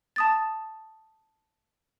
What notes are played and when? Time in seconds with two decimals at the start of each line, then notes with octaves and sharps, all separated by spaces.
0.16 A5 D#6 A6